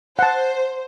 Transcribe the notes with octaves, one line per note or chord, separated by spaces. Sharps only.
C5 F#5 A5